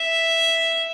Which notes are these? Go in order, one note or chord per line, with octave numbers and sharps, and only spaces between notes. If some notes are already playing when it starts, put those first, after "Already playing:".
Already playing: E5